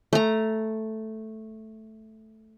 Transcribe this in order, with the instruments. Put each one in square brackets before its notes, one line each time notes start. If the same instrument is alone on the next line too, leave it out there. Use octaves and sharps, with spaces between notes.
[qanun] A3 A#5